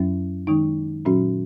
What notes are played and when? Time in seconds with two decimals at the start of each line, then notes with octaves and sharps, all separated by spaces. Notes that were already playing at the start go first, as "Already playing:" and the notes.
Already playing: F#2 F#3 C#4
0.47 D#3 G#3 D#4
1.05 A#2 F#3 C#4 F#4